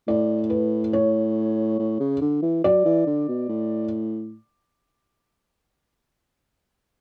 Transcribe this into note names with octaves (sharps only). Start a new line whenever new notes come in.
A2 D5
B4
C#5
A2
C#3
D3
E3
F#3 D5
E3
D3
B2
A2